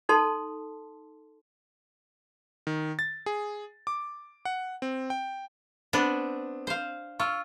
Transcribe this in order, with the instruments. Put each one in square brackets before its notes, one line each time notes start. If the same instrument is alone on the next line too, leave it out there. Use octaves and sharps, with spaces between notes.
[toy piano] D#4 A4 A5 C6
[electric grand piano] D#3
A6
G#4
D6
F#5
C4
G5
[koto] B3 D4 [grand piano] C4
[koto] C5 F5
[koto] F4 [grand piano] C#6 E6 F6